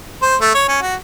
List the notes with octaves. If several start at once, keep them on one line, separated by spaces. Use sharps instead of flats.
C5
A3
C#5
C#4
F#4